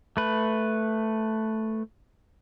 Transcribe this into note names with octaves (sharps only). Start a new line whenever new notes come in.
A3 B4